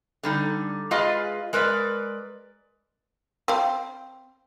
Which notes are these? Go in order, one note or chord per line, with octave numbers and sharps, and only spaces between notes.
D3 G3 D#4
G#3 F4 G#4 B4 D#5 F5
G#3 A#4 B4 D5
C4 F5